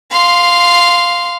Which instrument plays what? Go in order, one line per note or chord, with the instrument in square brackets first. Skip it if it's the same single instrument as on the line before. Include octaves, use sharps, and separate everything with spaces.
[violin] F5 C6